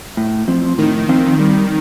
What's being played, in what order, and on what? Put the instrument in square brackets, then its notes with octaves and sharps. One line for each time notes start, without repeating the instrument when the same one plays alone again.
[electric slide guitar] A2
F3 C4
[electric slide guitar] A2 [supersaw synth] D#3
[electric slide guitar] F3 C4
G3